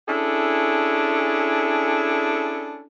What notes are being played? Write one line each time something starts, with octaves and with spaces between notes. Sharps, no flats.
C#4 D4 E4 G#4 A4